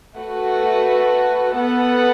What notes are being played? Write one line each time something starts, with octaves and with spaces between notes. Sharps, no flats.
A3 F#4 B4
B3 A4 F#5